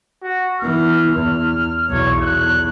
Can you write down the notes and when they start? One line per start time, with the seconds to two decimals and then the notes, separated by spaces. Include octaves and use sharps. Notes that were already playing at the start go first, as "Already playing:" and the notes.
0.23 F#4
0.60 E3 B3 F6
1.11 E2
1.89 B1 E2 C#5
2.21 F#6